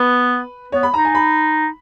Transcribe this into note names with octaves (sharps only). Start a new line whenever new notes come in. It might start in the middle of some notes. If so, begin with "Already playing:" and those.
Already playing: B3 B4
B3 C#5
B5
D#4 A#5
G#5
B5